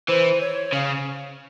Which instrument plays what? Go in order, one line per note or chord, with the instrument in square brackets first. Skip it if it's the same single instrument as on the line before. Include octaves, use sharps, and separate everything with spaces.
[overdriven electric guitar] E3 [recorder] C5
[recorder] C#5
[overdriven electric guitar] C#3 [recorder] F5